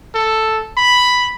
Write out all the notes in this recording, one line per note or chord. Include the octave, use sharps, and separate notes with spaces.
A4
B5